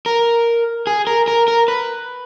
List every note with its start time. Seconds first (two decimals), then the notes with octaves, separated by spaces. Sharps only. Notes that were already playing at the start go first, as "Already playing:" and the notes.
0.06 A#4
0.87 G#4
1.07 A#4
1.28 A#4
1.48 A#4
1.68 B4